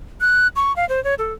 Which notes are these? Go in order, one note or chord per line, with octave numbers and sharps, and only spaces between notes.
F#6
C#6
F5
C5
C#5
A4